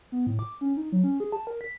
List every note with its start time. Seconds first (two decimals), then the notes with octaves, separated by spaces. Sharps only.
0.12 B3
0.27 A2
0.39 D6
0.61 C#4
0.77 D#4
0.92 F#3
1.04 C#4
1.20 G#4
1.32 A5
1.47 A#4
1.61 B6